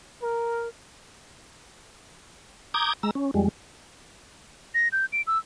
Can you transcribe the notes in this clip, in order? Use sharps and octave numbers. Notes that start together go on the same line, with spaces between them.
A#4
A#5 D6 D#6 G6 G#6
G#3 A#5 E6
C#4
F2 G3 G#3
A#6
G6
D7
E6